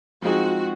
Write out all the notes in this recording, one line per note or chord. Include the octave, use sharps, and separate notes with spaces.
F3 G#3 C4 D#4 F#4 G#4